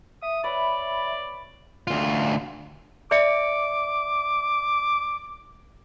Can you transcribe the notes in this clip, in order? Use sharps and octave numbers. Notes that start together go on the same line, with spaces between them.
E5 D#6
B4 C#5 D5
D2 F4
D5 E5 D6 C#7